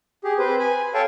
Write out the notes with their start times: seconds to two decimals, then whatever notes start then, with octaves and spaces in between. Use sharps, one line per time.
0.24 G4 G#4
0.39 C4 B4 C5
0.59 G#5 B5
0.94 A4 C#5 F5 G5 A5